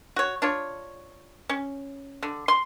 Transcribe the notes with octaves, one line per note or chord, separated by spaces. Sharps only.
F#4 C#5
D4 F4 C#5
C#4
D3
C6